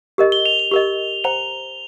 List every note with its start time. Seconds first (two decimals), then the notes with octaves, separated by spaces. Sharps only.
0.18 G4 A#4 D#5
0.32 G7
0.46 F7
0.59 G7
0.71 G4 A#4 D#5
1.24 C5 G5 A#5 F7